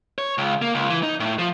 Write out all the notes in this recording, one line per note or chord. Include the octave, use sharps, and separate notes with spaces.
C#5
C#2
A#3
C#2
E3
D#4
A2
F3